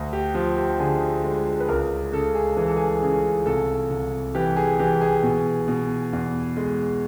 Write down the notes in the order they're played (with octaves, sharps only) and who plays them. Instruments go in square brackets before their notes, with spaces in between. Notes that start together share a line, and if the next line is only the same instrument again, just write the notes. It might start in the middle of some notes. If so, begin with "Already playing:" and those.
Already playing: [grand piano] D2
G4
F3 G4
G4
D3 G#4
G#3
B4
C#2 A#4
C#3 A4
G#4
E3 G#4
A4
G#4
C#3 G#4
C2 A4
C2
E3 G4
G#4
E3 G4
G#4
B2
B2
E2
G#3